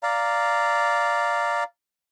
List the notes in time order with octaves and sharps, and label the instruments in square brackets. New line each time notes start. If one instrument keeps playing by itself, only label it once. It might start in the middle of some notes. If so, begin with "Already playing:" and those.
[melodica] D5 F5 A#5